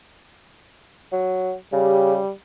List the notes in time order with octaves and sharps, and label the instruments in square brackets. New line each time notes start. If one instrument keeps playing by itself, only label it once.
[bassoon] F#3
[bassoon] C#3 [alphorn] G3 [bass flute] G4